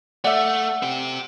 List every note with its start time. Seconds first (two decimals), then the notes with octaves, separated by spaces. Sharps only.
0.24 A3 D5 E5 F#5
0.83 C4 G4